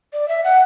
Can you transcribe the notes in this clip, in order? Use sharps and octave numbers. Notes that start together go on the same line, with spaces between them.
D5
E5
F#5